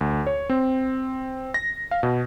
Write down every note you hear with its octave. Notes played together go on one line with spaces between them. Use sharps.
D2
C#5
C4
A#6
F5
B2